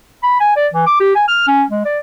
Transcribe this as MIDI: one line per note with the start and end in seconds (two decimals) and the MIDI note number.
0.23 0.39 83
0.40 0.56 80
0.56 0.67 74
0.74 0.86 52
0.86 0.95 86
1.00 1.13 67
1.15 1.23 80
1.28 1.45 89
1.47 1.63 61
1.70 1.84 56
1.85 1.99 74